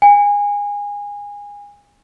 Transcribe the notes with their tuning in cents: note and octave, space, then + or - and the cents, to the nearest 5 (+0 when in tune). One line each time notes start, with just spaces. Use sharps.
G#5 -25